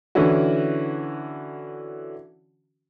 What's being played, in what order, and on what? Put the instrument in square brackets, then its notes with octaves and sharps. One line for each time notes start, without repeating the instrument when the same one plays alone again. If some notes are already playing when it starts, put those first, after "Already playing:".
[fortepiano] D3 E3 C#4 E4 F#4